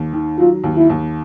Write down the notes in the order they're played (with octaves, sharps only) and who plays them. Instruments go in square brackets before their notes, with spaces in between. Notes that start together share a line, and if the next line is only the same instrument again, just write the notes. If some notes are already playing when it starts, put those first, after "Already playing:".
Already playing: [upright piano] D#2
D#3
[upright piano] F#3 [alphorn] F4
[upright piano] D#2
[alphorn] E4
[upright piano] D#2